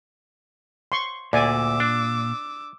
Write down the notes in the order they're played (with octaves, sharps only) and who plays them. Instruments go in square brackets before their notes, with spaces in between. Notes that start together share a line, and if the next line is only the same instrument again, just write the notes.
[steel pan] C6 C#6
[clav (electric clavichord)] D2 [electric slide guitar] A#2 [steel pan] D5 G#5 [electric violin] D6 E6
[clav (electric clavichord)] D4